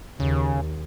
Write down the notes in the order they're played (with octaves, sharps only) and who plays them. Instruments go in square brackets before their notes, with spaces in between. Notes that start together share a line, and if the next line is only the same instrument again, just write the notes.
[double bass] D#2 [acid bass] C#3